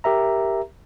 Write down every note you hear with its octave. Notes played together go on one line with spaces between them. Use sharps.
G4 A#4 E5 A#5